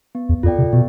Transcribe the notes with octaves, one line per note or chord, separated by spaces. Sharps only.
B3
E2
F2 F4 A4 D5 G5
C3
B2 B3